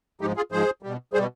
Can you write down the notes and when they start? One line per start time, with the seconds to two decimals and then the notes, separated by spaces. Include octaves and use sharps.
0.21 G#2 F3 G#3 D#4 G4
0.36 F4 G#4
0.52 G#2 F3 G#3 G#4 C5
0.83 B2 G3
1.13 B2 G3 G#4 C5